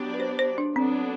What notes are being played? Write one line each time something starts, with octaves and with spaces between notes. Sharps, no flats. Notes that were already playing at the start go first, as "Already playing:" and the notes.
Already playing: F#3 B3 D4 G4 D5
B4
C5
C5
D4
F#3 B3 C4 D4 A4